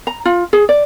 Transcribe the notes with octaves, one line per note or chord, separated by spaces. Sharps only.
A#5
F4
G#4
D5